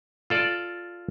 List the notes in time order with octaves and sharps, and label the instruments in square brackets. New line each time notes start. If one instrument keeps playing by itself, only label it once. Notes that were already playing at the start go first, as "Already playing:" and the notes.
[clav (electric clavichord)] F4 A4 D5